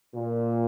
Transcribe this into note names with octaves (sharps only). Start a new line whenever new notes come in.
A#2